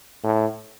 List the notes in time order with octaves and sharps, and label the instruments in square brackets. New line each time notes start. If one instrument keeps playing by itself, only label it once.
[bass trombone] A2